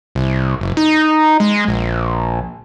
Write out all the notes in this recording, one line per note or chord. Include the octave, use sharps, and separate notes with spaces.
C2
F#1
D#4
G#3
A#1